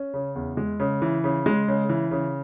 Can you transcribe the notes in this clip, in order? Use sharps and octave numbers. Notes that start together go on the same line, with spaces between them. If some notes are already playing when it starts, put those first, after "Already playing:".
Already playing: C#4
C#3
E2
G#3
C#3
E3
C#3
G#3
C#3
E3
C#3